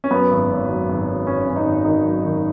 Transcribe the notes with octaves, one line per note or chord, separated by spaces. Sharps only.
C#4
F#2 B3
G#1
G#1
F#2
G#1
F#2
F#2 C#4
G#1 C#4
D#4
G#1
D#3 D#4
F#2
D#3